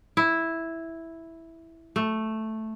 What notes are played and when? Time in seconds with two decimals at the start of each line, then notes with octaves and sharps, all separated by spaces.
0.17 E4
1.96 A3